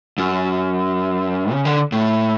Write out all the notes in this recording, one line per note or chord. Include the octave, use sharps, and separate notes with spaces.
F#2
C#3
D3
A2